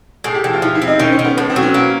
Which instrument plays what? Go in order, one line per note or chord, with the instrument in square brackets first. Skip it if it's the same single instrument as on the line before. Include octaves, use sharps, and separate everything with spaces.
[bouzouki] A2 [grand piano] G#4
[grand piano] G4
[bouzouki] E3
[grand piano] F4
[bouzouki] F3 [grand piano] E4
[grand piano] E4
[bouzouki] C4
[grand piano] D#4
[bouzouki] D#3 [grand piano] C#4
[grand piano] C#4
[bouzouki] D#3
[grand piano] B3
[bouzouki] A2 [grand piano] B3
[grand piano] C4
[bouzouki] F#3
[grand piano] C#4
[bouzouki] A#3